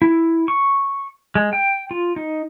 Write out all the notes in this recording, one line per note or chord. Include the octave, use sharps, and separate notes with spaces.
E4
C#6
G#3
G5
F4
D#4